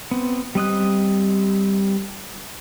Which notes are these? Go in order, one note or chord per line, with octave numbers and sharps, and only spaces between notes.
B3 C4
G3 C4 D#5 D#6 F#6